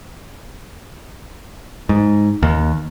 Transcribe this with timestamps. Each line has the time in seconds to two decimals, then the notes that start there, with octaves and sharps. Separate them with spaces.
1.89 G#2
2.43 D#2